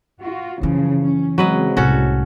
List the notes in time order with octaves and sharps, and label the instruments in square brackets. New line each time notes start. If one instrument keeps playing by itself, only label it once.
[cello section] F4 F#4
[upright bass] F#2 E3 [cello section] C#3 F3
[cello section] C#4
[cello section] C#3 G#3 C4 [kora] F#3 B4 D#5
[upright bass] C2 A2 [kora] C#4 F#4 A4